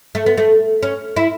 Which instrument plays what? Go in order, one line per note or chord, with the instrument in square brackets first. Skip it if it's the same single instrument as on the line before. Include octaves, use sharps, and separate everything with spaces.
[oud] A3
B3
A3
C#4
E4